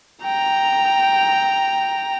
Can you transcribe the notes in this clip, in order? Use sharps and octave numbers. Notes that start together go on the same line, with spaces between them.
G5 A#5